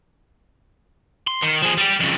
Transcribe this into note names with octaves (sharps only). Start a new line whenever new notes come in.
C6
D#3
F3 G#4
G3 G4
F2 C#3